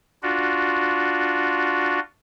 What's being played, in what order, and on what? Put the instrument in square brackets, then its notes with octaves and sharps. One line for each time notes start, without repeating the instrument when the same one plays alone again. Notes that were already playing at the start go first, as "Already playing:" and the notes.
[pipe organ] D4 F4 F#4